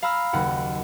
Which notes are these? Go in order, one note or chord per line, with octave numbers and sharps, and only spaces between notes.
F5 A#5 B5 E6 F6
F#1 D#2 F#5